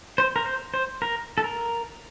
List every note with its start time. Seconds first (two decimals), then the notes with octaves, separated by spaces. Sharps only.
0.18 C5
0.36 A#4
0.46 C5
0.74 C5
1.02 A#4
1.38 A4
1.44 A#4